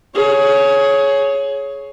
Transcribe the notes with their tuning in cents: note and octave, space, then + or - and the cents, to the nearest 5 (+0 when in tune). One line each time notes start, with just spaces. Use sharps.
G#4 +25 C#5 +0